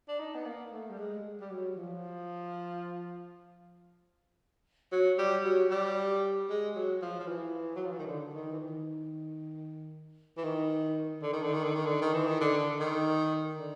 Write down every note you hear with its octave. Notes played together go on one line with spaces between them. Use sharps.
D4
D#4
B3
A#3
A3
G3
G#3
G3
F#3
F3
F#3
G3
F#3
G3
G#3
F#3
F3
F3
E3
F#3
F3
E3
D#3
D3
D#3
E3
D#3
E3
D#3
D3
D#3
D3
D#3
D3
D#3
D3
D#3
E3
D#3
D3
D#3
D3